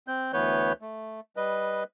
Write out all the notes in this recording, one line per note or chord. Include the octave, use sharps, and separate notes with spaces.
C4 G6
D2 E3 B3 B4 C#5 G6
A3
G3 B4 D#5